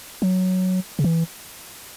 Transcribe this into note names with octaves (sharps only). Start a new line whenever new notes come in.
F#3
C#3
E3